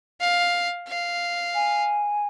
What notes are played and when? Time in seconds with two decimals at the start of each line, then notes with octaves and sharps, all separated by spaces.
0.20 F5
0.88 F5
1.55 G#5